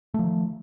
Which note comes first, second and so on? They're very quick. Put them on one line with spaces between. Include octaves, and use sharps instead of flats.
A3 F3 D#3